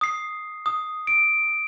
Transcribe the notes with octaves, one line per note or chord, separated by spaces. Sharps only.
D#6 C7
D#6
D7